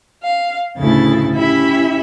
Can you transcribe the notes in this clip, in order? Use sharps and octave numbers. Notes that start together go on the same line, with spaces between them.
F5
D2 A2 C#3 A3 E4 A6
C#4 E4 G4 E5 B5